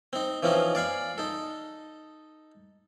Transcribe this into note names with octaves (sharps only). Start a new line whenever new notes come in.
C4 D#4
E3 F3 C4 C#4 D#4
D5 F5 G#5 B5
D#4 A4